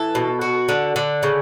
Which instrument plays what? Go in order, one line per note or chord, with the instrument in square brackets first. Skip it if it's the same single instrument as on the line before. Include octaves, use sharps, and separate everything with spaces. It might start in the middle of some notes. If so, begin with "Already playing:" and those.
Already playing: [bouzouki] E3 A4
B2
F#4
D3
D3
C#3